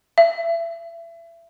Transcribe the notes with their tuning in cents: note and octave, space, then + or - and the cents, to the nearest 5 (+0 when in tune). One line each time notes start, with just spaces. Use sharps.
E5 +30